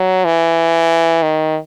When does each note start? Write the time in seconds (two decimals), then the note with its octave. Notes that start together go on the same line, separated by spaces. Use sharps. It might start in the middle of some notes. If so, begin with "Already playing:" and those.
Already playing: F#3
0.25 E3
1.23 D#3